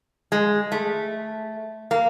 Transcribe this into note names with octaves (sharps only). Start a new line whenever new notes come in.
G#3
A3
A#3